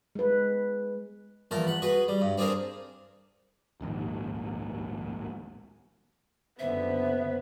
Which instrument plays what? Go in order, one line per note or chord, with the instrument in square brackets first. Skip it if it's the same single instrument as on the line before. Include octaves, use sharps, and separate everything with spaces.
[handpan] G#3 B4
[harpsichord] A#1 E2 A#4 A5
F#5 B5
F#4 G#4 B4
G3
G2
C4 D4 G#4 A#4 C5
[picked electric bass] D1 A#1 D#2 G#2
[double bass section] F#1 D3 [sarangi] B3 [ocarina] C5 [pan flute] E5